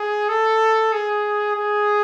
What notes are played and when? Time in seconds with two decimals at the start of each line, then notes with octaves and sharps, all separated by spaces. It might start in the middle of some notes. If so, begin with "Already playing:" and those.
Already playing: G#4
0.29 A4
0.93 G#4
1.56 G#4